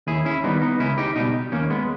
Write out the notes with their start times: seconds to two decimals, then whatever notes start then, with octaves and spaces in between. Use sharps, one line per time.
0.07 D#2 E4 G#4
0.25 C#4 E4
0.44 D#3 G3 B3 D#4
0.62 B3 D#4
0.80 C#2 C#4 E4
0.98 D#4 G4
1.16 B2 G3 D#4 G4
1.52 D#2 A#3 C#4
1.70 G#3 B3